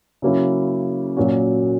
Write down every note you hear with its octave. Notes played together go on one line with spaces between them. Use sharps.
C#3 F#3 A#3 C#4 E4
A#2 F#3 A#3 C#4 F#4